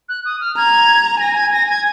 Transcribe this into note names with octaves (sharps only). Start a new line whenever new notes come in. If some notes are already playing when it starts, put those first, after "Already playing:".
F#6
D#6
F6
A#5 G#6
G#5 A#6
G#6
G#5 A#6
G#6